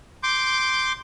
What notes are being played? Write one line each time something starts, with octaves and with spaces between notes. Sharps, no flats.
C6 D6 G6